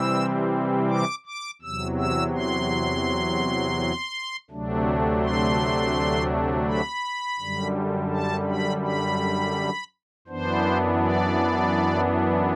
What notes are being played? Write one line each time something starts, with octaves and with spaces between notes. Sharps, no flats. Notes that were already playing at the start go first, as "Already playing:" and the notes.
Already playing: C3 E3 G3 C4 E6
D6
D6
E2 C3 F#3 E6
E6
C6
D2 C3 F#3 A3 D4
C6
B5
F#2 D3 G3
A5
B5
B5
F#2 E3 B3 D4 C5
D5